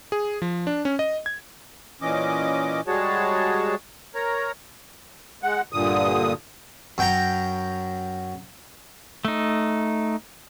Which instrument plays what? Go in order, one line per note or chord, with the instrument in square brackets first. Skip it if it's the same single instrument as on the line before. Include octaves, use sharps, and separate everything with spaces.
[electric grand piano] G#4
F3
D4
C#4
D#5
G#6
[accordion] A#2 E3 C#4 D#5 D6
G3 G#3 F#4 G#4 C#5 A5
A#4 C#5 A#5
G#3 F#5
G2 A#2 D3 D#6
[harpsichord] F#2 G5 A#5
[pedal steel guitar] A3 D#4